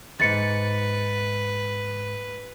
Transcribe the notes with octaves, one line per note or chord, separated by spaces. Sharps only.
D#2 G#2 B4 A6 C#7